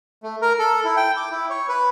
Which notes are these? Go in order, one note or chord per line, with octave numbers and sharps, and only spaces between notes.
A3
A#4
A4
E4
G5
D6
E4
C#5
B4